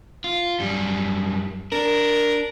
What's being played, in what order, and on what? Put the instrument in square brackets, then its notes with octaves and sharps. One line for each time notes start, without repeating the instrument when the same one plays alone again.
[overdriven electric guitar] F4
F#2 G3
[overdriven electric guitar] D4 [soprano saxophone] A#4